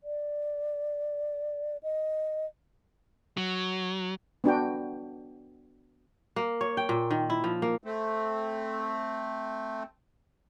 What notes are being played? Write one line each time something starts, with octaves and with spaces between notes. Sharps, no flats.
D5
D#5
F#3
B3 D4 F#4 G5
A#3
C#5
G5
A#2
D#3
E4
F3
A#3
A3 C4